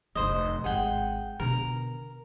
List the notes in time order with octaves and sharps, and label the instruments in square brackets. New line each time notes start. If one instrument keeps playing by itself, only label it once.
[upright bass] F1 D3 [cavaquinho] C5 D#5
[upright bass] G#1 [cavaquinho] G#4 F#5 G5
[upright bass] B2 D3 [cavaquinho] A#4